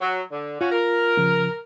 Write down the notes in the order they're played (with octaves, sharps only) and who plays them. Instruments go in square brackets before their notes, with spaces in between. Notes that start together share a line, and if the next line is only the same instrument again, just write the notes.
[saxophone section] F#3
D3
[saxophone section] C#4 F#4 [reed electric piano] F4
[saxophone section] A#4
[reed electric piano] C#3 F3